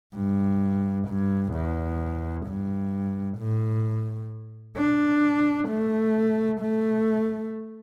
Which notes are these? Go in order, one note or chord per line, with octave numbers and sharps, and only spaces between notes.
G2
G2
E2
G2
A2
D4
A3
A3